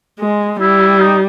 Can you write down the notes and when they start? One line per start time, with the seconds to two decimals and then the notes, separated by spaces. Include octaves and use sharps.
0.19 G#3
0.60 G3 E4
1.00 D#4